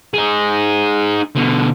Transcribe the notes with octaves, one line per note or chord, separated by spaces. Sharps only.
D#4 G#4
B2 D3